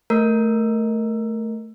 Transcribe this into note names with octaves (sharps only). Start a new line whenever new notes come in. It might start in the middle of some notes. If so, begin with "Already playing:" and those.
A3 A#4